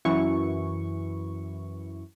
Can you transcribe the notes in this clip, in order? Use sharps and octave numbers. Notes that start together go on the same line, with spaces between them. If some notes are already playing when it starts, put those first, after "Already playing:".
F#2 E3 C#6